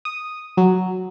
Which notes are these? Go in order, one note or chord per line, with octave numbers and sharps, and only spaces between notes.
D#6
F#3